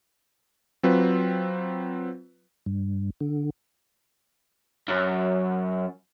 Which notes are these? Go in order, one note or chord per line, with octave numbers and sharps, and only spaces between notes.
F#3 C4 F4 B4
G2
D3
F#2